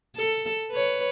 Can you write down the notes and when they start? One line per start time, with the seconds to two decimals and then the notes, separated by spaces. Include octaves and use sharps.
0.16 A4
0.71 B4 C#5